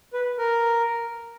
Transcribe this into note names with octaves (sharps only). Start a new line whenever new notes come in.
B4
A#4